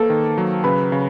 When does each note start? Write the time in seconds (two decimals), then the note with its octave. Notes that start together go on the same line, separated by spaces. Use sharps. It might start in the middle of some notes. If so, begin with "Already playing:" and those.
Already playing: A#3 A4 B4 C5 A5
0.10 D#3
0.38 F#3
0.64 C#3 B4 B5
0.92 C#3